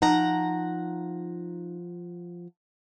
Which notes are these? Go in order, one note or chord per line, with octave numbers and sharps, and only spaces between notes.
F3 D#4 F#5 A#5